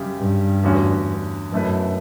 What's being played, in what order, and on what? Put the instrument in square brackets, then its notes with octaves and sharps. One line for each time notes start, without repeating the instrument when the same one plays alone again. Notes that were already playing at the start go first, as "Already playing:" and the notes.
Already playing: [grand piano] F#2 C#3 G3
[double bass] G2
[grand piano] E2 D3 A3 C#4 F#4
[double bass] F#2 [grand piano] B2 A3 E4 B4